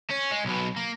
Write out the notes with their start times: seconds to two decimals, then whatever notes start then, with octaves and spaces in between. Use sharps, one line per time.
0.11 C#4
0.31 G#3
0.45 B1 B2
0.76 A#3